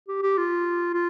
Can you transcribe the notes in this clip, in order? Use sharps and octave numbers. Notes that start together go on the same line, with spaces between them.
G4
G4
F4
F4